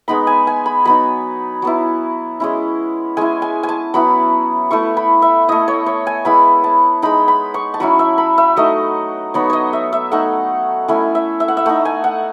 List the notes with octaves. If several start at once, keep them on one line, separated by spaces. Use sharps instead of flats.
G#3 B3 D#4 B5
G#5
G#5
B5
F#3 B3 D#4 B5
F#3 B3 E4
G#3 C#4 E4
G#3 C#4 E4 G#5
G#5
G#5
A5
F#3 B3 E4 B5
A3 E4 C#6
B5
E5
A3 E4 D#5
C#5
C#5
G#5
G#3 B3 E4 B5
A5
G#3 D#4 B5
B5
C#6
A5
F#3 C#4 E4 B5
E5
B5
E5
F#3 A3 D#4 D#5
F#3 B3 D#4 C#5
C#5 D#5
E5
E5
A3 D#4 F#5
A3 C#4 E4 G#5
E5
E5
F#5
E5
A3 D#4 F#5
G#5
F#5